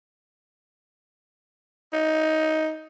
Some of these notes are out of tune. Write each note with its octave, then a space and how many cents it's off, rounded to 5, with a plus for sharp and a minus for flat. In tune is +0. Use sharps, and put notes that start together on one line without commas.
D#4 +15